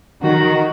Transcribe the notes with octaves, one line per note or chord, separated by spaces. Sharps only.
D#3 F#4